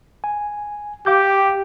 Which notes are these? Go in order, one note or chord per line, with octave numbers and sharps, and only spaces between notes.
G#5
G4 F5 D6 G6